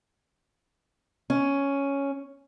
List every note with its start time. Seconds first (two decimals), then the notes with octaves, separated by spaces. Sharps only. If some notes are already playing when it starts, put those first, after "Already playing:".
1.30 C#4